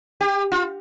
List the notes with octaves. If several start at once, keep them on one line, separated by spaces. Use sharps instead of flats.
G4
F4